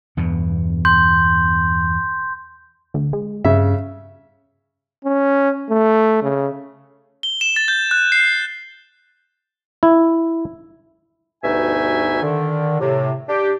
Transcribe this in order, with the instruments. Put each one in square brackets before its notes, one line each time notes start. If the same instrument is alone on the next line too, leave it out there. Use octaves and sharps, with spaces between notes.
[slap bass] E2 G2 B2
[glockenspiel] C6 G6
[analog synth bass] D2
G#3
[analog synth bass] G2 [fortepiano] C#3 E5
[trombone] C#4
A3
C#3
[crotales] G7
E7
A6
G6
F#6
C7
[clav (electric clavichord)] E4
[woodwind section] D2 G2 B2 D#4 E5 G#5
D3 D#3
A2 C3
D4 G4